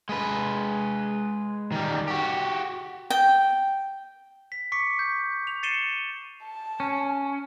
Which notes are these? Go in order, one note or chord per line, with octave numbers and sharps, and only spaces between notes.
G#3 B4
D#3 G3
F#4 G4
G5
B6
C#6 D6 B6 C#7
G6
F7
A6 C7 C#7 D#7 E7 G7
A5
C#4